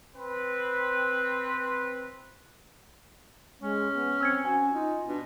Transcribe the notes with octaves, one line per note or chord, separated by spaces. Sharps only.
C4 B4
G#3 C#4
B3
C4 E6 G#6 C#7
C#4 F#4 G#5
D#4 F4
B2 D4